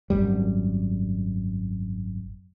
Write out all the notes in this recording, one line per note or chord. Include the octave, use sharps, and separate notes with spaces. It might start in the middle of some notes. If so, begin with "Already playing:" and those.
G#1 F#2 G3